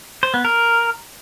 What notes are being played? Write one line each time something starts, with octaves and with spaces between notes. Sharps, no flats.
C5
B3
A#4